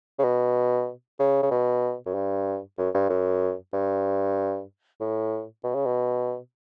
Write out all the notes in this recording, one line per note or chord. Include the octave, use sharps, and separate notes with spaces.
C#3
B2
C#3
C#3
B2
F#2
G2
F#2
G2
F#2
G2
A2
B2
C#3
B2